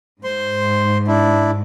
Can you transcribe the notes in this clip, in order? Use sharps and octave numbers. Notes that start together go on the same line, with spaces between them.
G#2 C5 C6
D4 E4